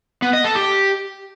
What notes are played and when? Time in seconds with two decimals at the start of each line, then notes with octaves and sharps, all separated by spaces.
0.22 B3
0.33 D#5
0.44 A4
0.55 G4